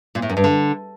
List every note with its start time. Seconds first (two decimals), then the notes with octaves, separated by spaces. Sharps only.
0.15 A#2
0.22 A2
0.29 F#2
0.37 G2
0.44 D3